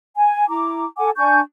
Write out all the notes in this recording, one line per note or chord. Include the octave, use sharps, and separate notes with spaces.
G#5
E4 A#5 D6
A4 F#5 G#5 D6
D4 G#5 C#6 G6